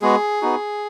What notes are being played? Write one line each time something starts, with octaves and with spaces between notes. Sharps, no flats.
G#3 B3 F#4 G#4
B3 D#4 F#4